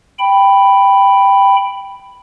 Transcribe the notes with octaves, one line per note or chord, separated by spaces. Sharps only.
G5 B5